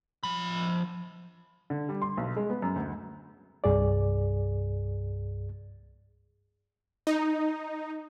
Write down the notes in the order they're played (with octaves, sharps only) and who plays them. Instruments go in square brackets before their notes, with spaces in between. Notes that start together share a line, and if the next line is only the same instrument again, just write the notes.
[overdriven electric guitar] F3 B5
[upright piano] D3
G3
C6
B1
G#3
B3
F#2
D2
[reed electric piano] C2 G2 G#4 D5
[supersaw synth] D#4